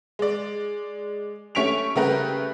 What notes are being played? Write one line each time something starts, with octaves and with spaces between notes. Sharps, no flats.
G#3 D5
A3 C#4 C#6 B6 D7 F7
C#3 G3 A3 G4 A#4 B4